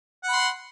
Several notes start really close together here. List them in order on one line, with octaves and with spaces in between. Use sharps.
F#5 B5 C6